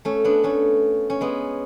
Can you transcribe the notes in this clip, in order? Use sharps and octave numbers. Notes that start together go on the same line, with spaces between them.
A3 C#4
B3 D4
A3 C#4
C#4
G#3 B3